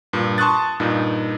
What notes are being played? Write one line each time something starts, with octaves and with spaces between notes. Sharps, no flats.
G2 A#2
A5 C6 C#6 D#6 F#6 A6
G2 A#2 D#4